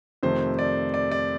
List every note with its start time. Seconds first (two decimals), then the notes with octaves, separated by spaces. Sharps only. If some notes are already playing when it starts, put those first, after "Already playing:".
0.23 F2 C3 D#3 A3 C5
0.59 D5
0.94 D5
1.11 D5